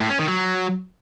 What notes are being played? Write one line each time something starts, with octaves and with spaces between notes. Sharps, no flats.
A2
C#4
D#3
F#3